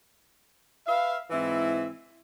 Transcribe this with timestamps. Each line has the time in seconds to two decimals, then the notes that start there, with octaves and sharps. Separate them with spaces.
0.87 B4 E5 F5
1.30 G#2 E3 C4 E4